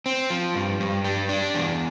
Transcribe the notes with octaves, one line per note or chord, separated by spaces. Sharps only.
C4
F3
G2
G2
G3
D4
E2